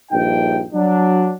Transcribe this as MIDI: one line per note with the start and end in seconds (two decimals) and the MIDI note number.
0.11 0.62 34
0.11 0.62 43
0.11 0.62 63
0.11 0.62 79
0.73 1.32 54
0.73 1.32 62